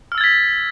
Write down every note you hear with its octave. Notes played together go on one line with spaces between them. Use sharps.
E6 F6 G#6 A6 B6